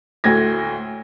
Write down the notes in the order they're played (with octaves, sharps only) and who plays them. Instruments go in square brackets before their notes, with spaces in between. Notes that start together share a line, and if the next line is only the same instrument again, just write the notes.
[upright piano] D2 A2 G#6 A#6